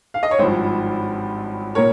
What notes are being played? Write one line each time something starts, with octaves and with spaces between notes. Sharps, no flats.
F5
D#5
C#5
G#1 G2 F3 C5
A#2 A#4 C#5